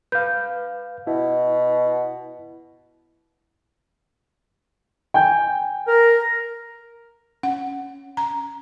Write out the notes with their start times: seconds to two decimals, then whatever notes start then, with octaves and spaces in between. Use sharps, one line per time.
0.12 B4 F5 G6
1.07 B2 E4
5.14 G5 G#5 G6
5.88 A#4
7.43 C#4 F#5
8.17 A#5